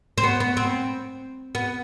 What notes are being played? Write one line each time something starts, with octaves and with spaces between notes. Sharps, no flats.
C4
B3
B3
C4
B3